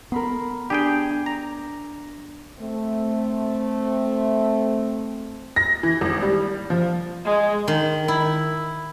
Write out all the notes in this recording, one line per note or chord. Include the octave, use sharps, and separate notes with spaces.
B3 A#4 B5 C6
D4 G4 G#4 G5
A#5
A3 C4
A#6
E3
G#1
G3
F3
G#3
D#3
E4